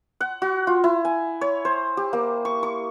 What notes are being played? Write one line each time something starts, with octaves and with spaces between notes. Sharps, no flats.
F#5
F#4
F4
E4
G#5
C#5
C5
G4
A#3
C#6
C#6